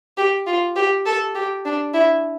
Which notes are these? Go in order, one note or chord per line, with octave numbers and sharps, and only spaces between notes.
G4
F4
G4
A4
G4
D4
E4